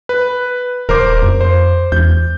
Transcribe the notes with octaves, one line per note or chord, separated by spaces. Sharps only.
B4
D#1 A#4 C5 D6
F2
C5
E2 G6